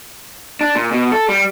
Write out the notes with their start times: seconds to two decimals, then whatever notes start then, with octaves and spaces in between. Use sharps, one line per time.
0.61 D4
0.75 A#2
0.92 B2
1.12 A4
1.29 G3